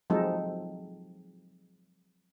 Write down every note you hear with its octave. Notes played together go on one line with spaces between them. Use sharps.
F3 F#3 G#3 C4 D#4 A4